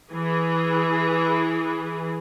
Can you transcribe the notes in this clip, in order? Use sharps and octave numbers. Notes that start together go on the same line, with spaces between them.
E3 G#4